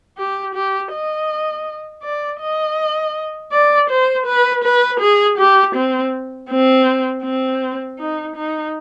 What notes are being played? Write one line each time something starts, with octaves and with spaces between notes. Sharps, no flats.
G4
G4
D#5
D5
D#5
D5
C5
B4
B4
G#4
G4
C4
C4
C4
D#4
D#4